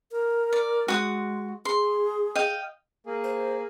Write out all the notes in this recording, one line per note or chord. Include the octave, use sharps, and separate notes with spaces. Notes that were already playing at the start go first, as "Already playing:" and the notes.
A#4
D5
G#3 F#4 D#6
G#4 C6
D#5 F5 G5
A#3 G#4
C5